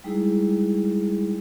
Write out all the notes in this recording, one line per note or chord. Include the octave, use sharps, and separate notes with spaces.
G3 G#3 D#4 E4 G#4